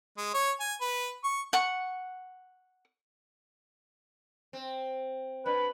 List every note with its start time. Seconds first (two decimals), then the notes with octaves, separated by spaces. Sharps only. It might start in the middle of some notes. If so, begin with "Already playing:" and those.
0.18 G#3
0.34 C#5
0.60 G#5
0.81 B4
1.24 C#6
1.53 F#5 C#6
4.53 C4
5.46 G2 B4